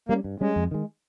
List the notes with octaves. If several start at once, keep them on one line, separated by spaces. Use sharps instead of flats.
G3 A#3 C#4
G2
G3 G#3 C#4
F2
D#3 G#3